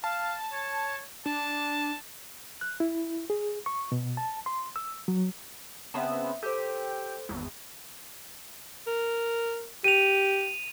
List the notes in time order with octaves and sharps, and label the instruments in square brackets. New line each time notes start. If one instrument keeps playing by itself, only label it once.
[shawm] F5 [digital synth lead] A5
[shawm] C#5
[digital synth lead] D4 [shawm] A5
[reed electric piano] F#6
E4
G#4
C#6
B2
A5
C6
E6
F#3
[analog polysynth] C#3 B3 C4 [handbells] E5 A5
[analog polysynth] G4 [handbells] A4 C5
[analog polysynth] G#1 E2
[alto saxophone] A#4
[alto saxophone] G4 [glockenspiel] D#7 F7